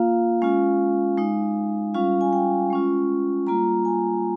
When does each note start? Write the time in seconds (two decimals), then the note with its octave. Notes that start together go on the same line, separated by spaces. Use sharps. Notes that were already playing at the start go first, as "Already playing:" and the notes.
Already playing: A#3 F4 F5
0.42 G#3 C#4 F4
1.17 G#3 D#4
1.94 G3 C#4 F4 F5
2.21 G#5
2.33 G5
2.70 G#3 C#4 F4
3.47 G3 A#3 F4 A#5
3.85 G#5